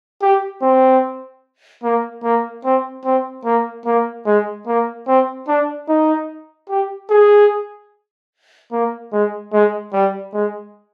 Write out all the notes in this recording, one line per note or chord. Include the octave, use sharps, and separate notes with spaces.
G4
C4
A#3
A#3
C4
C4
A#3
A#3
G#3
A#3
C4
D4
D#4
G4
G#4
A#3
G#3
G#3
G3
G#3